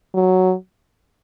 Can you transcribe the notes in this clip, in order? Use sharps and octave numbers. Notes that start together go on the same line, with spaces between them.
F#3